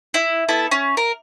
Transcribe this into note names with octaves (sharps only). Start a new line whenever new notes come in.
E4
B3 E4 A4
C#4
A#4